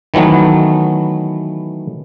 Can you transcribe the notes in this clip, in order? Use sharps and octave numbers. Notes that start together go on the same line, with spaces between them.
D#3 E3 F#3 A3 B3